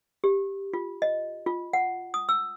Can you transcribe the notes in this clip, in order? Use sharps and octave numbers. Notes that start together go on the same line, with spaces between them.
G4
F4
D#5
F4
F#5
D#6
E6